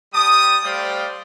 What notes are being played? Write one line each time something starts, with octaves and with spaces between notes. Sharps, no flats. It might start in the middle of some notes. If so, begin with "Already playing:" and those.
G3 G5 A5 D#6
G3 A3 C5 D5 F5 G5